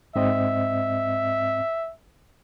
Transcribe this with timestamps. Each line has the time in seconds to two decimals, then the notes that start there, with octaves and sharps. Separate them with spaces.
0.16 G#2 C4 D#5 E5